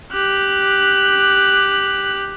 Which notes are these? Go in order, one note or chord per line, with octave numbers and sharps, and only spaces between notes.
G4 F#6